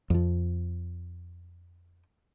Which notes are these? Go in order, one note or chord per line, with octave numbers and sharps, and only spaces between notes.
F2 F3